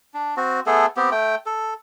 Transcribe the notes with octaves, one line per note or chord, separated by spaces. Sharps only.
D4
C4 F#4
A3 B3 G#4 A4
B3 C4 G4
A3 G5
A4